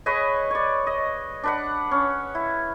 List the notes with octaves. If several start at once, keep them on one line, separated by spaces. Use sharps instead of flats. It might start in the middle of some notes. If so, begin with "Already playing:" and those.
G#4 B4 C#5 D#5
C#5 D5
D#5
D4 B4 F#5
C#4
E4